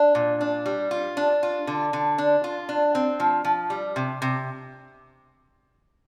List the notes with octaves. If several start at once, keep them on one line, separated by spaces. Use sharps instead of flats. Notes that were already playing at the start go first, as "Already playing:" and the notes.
Already playing: D4
A#2
D4
G3
F4
D4
F4
D3
D3
D4
F4
D4
C4
F3
F3
G3
C3
C3